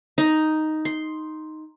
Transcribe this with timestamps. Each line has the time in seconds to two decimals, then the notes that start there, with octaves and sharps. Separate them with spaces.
0.18 D#4
0.85 C6